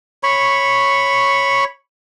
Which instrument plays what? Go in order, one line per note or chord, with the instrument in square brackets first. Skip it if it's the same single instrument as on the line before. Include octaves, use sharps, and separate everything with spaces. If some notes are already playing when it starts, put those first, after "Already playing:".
[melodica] C#5 B5 C#6